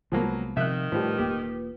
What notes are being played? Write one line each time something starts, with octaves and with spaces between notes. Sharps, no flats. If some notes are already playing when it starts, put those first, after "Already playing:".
C2 F3 F#3 G#3 A#3 B3
C3 D#3 F3 E5 F#6
A2 F3 G3 F4 B4
E1 A#3 G4